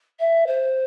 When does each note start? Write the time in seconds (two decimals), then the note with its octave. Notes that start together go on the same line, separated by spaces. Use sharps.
0.20 E5
0.47 C5